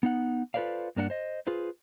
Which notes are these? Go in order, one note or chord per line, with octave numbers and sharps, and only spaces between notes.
B3 D#4 F#5
F4 A4 B4 C5 D5 F5
G2 A#3 D4 G4 F#5
C5 D#5
F4 G#4 B4 C5